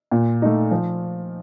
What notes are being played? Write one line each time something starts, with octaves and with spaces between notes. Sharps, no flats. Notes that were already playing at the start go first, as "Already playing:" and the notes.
A#2
A3 D#4
F3